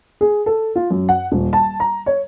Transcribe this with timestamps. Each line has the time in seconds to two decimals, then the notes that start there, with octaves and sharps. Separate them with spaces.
0.21 G#4
0.46 A4
0.76 F4
0.90 F#2
1.09 F#5
1.32 D#1
1.53 A5
1.80 A#5
2.06 C#5